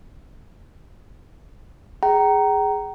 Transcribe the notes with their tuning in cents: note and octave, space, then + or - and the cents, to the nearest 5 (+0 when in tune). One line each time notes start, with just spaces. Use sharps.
G#4 +0 G5 -40 A#5 +0